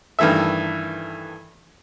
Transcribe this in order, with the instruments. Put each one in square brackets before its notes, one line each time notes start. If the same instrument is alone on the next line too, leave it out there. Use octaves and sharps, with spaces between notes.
[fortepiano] G2 D#3 E3 A3 E5